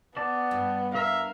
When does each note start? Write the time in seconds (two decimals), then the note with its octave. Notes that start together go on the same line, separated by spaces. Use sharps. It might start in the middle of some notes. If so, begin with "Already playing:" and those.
0.17 B3 D5 A5
0.51 G2
0.95 A#4 E5 F5 A#5